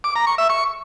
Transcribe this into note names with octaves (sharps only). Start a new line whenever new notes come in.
D6
A#5
C#6
E5
C#6